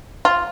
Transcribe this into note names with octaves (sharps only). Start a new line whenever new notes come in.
F4